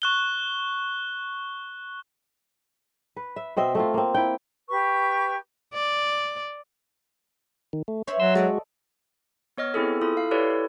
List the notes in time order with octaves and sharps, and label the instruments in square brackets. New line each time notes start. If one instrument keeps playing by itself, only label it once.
[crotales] C#6 F#6 G7
[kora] B4
E5
B2 C4 D#5 E5
A3 C4 F4
A#3 C4
E4 G5
[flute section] G4 B4 C#6
[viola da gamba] D5
[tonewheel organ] D#3
A3
[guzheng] C5 E5 B5 [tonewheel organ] C#5
[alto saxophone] F#3 [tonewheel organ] C6 E6
[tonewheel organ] G#3 F#4 [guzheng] A4 D5 D#5
[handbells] B3 C#5 D#5 F6
B3 C4 E4 G#4 A4
E4 F4 A4 D#6
F5
E4 G4 A4 B4 C#5 D5
A4